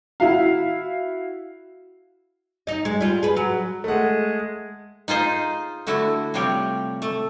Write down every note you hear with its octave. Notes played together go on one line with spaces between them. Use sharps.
E4 F#4 F5
D#4 D#5
G#3
G3 F4
G#4 B4
F#3
G#3 A3 F#5
D#4 F4 G#4 C5
D3 A3 E4 F#4
C3 F3 G3 G4 C#5
A3